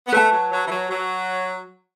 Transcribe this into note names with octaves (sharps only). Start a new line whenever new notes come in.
B3
A3 B4 A5
F#3
F#3
E3
F#3
F#3